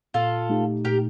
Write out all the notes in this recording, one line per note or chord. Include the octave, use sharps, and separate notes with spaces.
A#2 F4 A4
A3 D#4 G4
A#2 G4 A#4